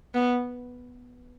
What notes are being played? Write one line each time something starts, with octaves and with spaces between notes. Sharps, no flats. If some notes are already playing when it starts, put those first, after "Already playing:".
B3